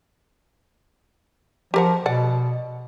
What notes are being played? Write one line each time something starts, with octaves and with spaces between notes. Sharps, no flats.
F3 G4 A#4 F#5
B2 D5 F#5